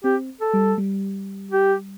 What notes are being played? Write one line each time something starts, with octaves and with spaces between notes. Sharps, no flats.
C4 G4
A4
G3
G3
G4